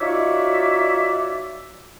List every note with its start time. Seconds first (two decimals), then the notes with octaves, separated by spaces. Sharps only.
0.01 D#4 F4 F#4 C#5 D5 E5